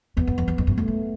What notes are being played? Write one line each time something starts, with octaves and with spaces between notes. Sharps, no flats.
E2 B3
F2
F2
E2
F2
F#2
F#2 A3
G#2